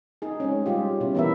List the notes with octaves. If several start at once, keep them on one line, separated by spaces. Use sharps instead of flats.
D#4 G#4
G#3 C4 C#4
G3 G#3 F4 G4
B2 C#4 E4
E3 B3 E4 A#4 E5